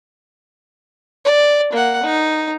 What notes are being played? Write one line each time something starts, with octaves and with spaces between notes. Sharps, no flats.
D5
A#3 F#5
D#4